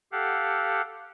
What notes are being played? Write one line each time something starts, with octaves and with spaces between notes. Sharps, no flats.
G4 A4 F5 F#5